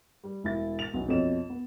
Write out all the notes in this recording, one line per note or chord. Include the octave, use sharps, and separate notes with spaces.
G3
E1 E4 A6
A6 F7
B1 E2
F2 B2 A4 C#5 D#5 E7
B3